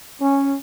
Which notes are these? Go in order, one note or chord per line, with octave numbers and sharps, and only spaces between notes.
C#4